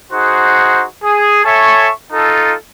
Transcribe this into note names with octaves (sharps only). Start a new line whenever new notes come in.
D#4 F#4 G#4 C5 F#5
G#4
A4 C#5 E5 G#5 C#6
D#4 F4 A4